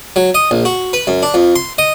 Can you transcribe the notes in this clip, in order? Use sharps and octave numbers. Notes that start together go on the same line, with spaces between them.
F#3
D#5
A#1
F#4
B4
F#2
D4
F2
C6
D#5